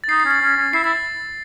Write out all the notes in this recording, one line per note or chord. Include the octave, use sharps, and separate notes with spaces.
A6
D#4 C7
C7
C#4
A6
C#4
C#4
E4 C7
E4 A6